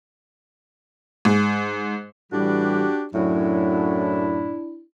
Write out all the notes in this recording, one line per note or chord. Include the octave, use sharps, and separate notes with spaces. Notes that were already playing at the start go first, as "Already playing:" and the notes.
G#2
A2 E3 G3 D4 F#4 G4
F#2 A2 F#3 D4 E4